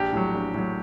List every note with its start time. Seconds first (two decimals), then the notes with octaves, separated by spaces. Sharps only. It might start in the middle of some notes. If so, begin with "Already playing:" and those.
Already playing: A#1 G4
0.13 A2 F#3
0.33 A#1
0.54 A2 F#3